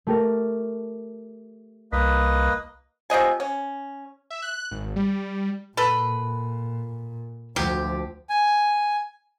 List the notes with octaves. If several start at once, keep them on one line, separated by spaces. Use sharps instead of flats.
A3 G4 A#4
C2 A#3 B4 D#5 B6
C3 F3 D#5 G#5
C#4
E5
F#6
G#1
G3
A#2 A4 B4
D2 F3 F#3 G4
G#5